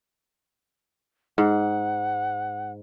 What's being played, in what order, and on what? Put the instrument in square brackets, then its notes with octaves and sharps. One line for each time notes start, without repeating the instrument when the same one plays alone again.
[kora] G#2 [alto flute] F#5